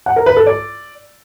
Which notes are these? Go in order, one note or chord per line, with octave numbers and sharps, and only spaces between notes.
F#5
A#4
B4
A4
D5